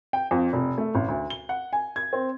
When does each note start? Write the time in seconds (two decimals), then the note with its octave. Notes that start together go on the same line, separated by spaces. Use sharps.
0.13 G5
0.31 F2
0.53 F1
0.78 A3
0.95 A1
1.08 D2
1.30 G7
1.49 F#5
1.73 G#5
1.96 G#6
2.13 C4